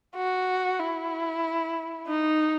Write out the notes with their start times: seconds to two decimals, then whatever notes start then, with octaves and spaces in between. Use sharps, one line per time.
0.16 F#4
0.79 E4
2.07 D#4